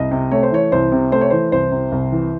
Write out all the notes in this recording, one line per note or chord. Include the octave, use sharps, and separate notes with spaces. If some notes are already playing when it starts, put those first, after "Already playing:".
Already playing: C2 D#5
C3
A3 C#5
C5
E3 C#5
C2 C5
C3
A3 C5
C#5
E3 C5
C2 C5
C3
C2
E3